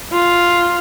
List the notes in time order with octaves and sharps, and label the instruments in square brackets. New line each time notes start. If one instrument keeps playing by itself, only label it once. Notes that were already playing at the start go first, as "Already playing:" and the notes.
[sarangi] F4